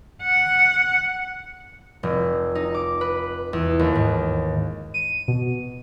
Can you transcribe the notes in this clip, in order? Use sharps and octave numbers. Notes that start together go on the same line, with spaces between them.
F#5
F1
D#4
D6
B4
E2
D#2
G#2
D#7
B2